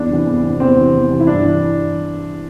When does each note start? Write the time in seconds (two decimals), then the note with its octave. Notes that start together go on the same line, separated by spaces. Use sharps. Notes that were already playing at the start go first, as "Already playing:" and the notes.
Already playing: E2 D4
0.11 C3 E3
0.26 E2
0.44 C3 E3
0.60 E2 C4
0.76 C3 E3
0.93 E2
1.09 C3 E3
1.20 E4
1.27 G2 D4
1.43 E3